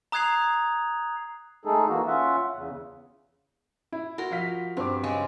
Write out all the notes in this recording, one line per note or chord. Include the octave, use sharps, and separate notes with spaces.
A#5 D#6 F#6 G#6 C7 F7
G#3 A3 D#4 G#4 A4
E3 A#3 F#4
C#4 F4 E5 F#5
E2 C#3
E4
F#4 A#4 C6
F3 F5 B6
G2 C4 D6
C#3 G#3 C#6